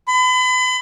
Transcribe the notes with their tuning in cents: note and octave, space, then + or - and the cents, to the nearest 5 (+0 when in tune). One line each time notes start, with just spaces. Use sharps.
B5 +40